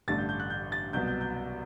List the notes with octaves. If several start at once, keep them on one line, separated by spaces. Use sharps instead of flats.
A1 G2 D3 A3 A6
G6
G6
F#6
G6
A6
C2 B2 F#3 B3 G6
G6
G6